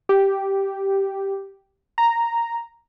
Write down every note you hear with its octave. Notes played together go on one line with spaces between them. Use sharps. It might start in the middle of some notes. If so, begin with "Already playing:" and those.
G4
A#5